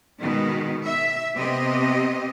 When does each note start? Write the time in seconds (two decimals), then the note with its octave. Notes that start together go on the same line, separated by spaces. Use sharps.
0.20 B2 D#3 G#3 B3
0.86 E5
1.37 C3 B3 C4 G4 D#5